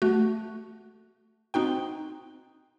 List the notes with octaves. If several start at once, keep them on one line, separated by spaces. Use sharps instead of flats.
A3 F#4
C4 D#4 F#4 G5